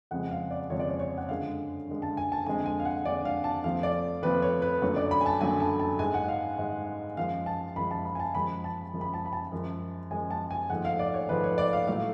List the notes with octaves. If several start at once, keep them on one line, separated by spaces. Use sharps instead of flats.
F2 C#3 F3 G#3 F#5
F5
D5
F2 C#3 F3 G#3 C#5
D5
C#5
C#5
F#5
F#2 D3 G#3 F5
F#2 D3 G#3
A5
G#5
A5
F2 D3 G#3 G#5
G#5
F5
F#5
F2 D3 G#3 D5
F5
A5
F2 F3 A3 F5
D5
F2 F3 A3 B4
C#5
B4
F#2 D3 F#3 A3 C#5
D5
B5
G#5
A5
F#2 D3 F#3 A3 G#5
A5
A5
G#2 G#3 G#5
F#5
F5
G#2 G#3
F#2 F3 G#3 F5
A5
F#2 F3 G#3 B5
A5
B5
G#5
A5
F#2 F3 G#3 B5
A5
F#2 F3 G#3
B5
A5
B5
A5
F#2 F3 G#3
F#2 F3 G#3 G#5
A5
G#5
G#2 F3 A3 F#5
F5
D5
C#5
G#2 F3 A3 B4
C#5
D5
F5
A2 F#3 A3 F5